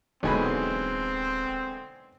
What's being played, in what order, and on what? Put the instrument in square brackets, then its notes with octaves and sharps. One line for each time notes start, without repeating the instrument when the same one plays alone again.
[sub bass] D1 [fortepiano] B1 G#5 B5 [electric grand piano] D3 E3 G#3 [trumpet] C4